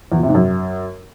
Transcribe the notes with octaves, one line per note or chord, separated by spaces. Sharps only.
E2
A#2
C3
G#2
F#2